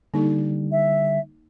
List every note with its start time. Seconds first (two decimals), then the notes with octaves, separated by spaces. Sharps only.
0.14 D3 G3 A#3 D#4 A4
0.72 E5